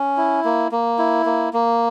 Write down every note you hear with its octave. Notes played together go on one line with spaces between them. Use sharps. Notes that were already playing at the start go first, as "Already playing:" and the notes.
Already playing: C#4
E4
A#3
A#3
E4
A#3
A#3